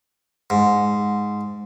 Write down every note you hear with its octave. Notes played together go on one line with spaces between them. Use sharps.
G#2